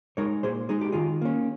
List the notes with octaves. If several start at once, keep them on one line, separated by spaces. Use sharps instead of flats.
G#3 D#4 A#4 C#5
A#2 G#4 C5
G#3 D#4 G#4
G4
D#3 F4 G#4
A#3 C#4